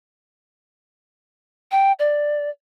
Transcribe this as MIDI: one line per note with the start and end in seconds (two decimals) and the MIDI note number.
1.71 1.92 79
1.99 2.49 74